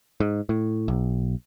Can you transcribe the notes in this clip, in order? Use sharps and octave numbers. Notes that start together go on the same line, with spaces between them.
G#2
A2
B1